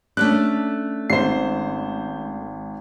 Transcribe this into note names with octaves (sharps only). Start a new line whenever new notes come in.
A3 C#4 D4 F#6
G#1 C5 C7